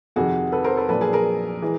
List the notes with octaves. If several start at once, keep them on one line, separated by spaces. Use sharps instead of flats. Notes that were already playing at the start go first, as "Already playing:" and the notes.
F2 C3 D#3 F#4 G#4
A4 B4
A#4 C5
A4 B4
A#1 A#2 F#3 A4 B4
G#4 A#4
G#4 A#4
E3 G#3